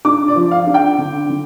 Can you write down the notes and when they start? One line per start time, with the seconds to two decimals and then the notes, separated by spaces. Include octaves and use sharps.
0.05 D4 D6
0.28 D5
0.35 F3
0.51 F5
0.67 D4
0.74 G5
0.98 D3
1.29 D3